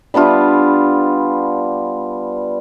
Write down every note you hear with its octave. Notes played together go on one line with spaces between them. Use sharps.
G3 B3 D4 F4